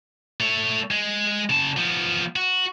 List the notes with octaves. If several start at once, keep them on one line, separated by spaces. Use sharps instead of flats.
A3 C#5
G#3
C#3 A5
F3 B3
F#4